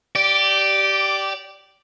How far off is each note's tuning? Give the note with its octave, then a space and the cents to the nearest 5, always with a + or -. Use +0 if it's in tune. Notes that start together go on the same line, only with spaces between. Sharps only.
G4 -15 D5 +0